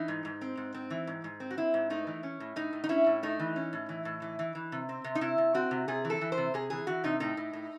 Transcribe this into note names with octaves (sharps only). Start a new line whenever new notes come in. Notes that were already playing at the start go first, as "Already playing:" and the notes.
Already playing: E3 D#4
G#2
G#2
C4
G#2
C4
E3
G#2
G#2
C4
F#4
C4 E4
G#2
A3 D#4
E3
C#4
A2
A2 D#4
A2
D#4
C#4 E4
A2
A3 D#4
E3
C#4
A2
E3
A2
E3
E3
E3
C3
C4
C3
D#4
C3 E4
C3
C4 F#4
C3
C3 G#4
E3
A4
E3
C5
C3
C3 G#4
E3 G#4
E3 F#4
C3 D#4
A2 D#4
A2
A2